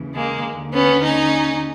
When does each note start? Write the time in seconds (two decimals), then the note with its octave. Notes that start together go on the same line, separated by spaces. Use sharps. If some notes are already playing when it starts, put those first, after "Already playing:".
Already playing: D#2 C#3 E3
0.14 G#3 A#3
0.44 D#2 D3
0.74 B3 C#4
1.03 C#4 D#4